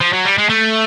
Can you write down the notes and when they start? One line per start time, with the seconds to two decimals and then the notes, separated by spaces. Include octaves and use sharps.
0.01 F3
0.13 F#3
0.25 G3
0.38 G#3
0.50 A3